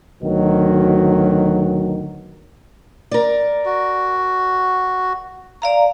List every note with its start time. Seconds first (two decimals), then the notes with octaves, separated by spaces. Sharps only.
0.23 D2 B2 D#3 F#3
3.11 A#4 D5
3.65 F#4
5.62 D5 F5 A#5